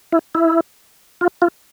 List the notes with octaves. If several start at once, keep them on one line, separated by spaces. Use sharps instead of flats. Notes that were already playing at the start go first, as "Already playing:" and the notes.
E4
E4
F4
F4